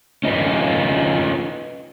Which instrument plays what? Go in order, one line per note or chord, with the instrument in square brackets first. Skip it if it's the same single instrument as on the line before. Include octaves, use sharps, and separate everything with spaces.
[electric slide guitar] C#4 D#4 F4 B4